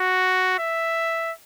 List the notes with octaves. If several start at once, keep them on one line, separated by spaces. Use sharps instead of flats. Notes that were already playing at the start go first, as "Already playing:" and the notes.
Already playing: F#4
E5